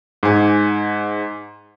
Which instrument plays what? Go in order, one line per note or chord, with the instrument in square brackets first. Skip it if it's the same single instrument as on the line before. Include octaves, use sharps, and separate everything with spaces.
[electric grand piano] G#2 G#5